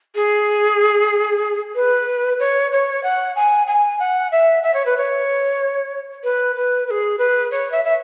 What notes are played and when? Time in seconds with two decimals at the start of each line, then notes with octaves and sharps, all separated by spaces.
0.15 G#4
1.75 B4
2.39 C#5
2.72 C#5
3.03 F#5
3.36 G#5
3.67 G#5
3.99 F#5
4.32 E5
4.63 E5
4.74 C#5
4.86 B4
4.97 C#5
6.24 B4
6.56 B4
6.87 B4
6.91 G#4
7.18 B4
7.51 C#5
7.72 E5
7.84 E5